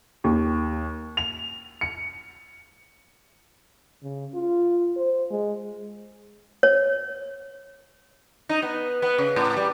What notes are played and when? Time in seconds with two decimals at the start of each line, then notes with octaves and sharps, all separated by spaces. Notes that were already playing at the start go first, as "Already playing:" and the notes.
0.24 D#2
1.17 F7
1.81 C#7
4.03 C#3
4.35 F4
4.96 C5
5.31 G#3
6.63 C#5
8.49 D#4
8.62 B3
9.02 B3
9.18 C#3
9.36 A2
9.56 G3